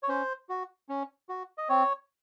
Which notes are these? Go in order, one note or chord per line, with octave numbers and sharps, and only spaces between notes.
C#5
C#4 C5
F#4
C#4
F#4
D#5
C4 C#5